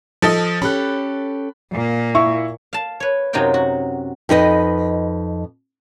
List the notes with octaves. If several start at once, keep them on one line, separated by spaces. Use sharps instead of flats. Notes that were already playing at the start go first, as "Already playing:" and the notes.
F3 A4 D#5
C#4 G4 A4 B5 F#6
A#2 A#3
E4 E5 C#6
F5 A5
B4 C#5
F#2 C3 F#3 D#4 F4 G5
F#4
F2 D#4 B4 D#5